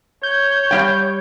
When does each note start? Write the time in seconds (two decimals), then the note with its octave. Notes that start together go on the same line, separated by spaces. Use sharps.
0.23 C#5 G6
0.71 G3 A#3 G5